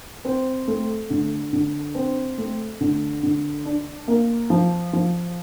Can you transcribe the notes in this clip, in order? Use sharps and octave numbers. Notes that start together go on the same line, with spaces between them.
C4
A3
D3
D3
C4
A3
D3
D3
D4
A#3
F3
F3